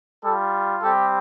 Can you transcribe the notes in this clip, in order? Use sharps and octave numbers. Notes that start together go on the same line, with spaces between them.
G3 F4 A4
G3 C4 G4 A4